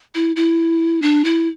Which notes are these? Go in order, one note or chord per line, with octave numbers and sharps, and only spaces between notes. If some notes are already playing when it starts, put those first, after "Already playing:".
E4
E4
D4
E4